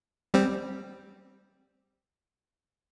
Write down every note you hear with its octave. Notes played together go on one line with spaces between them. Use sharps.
G3 C4